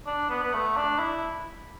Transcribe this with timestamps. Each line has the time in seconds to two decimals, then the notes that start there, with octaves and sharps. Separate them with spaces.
0.06 D4
0.29 B3
0.43 B3
0.53 A3
0.77 D4
0.99 E4